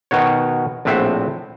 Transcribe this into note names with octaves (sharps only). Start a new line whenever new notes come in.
B2 D#3 F#4 C#5
A#1 A2 C4 E5 F#5